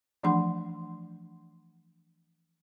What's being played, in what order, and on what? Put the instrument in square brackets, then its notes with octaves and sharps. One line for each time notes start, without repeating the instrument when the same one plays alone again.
[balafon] E3 F3 A3 D4 F#5 C6